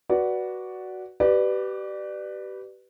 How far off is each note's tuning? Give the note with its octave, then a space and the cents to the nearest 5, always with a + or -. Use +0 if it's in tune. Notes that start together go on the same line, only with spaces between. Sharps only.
F#4 +5 B4 -15 D5 -5
G4 -30 B4 +5 D5 +20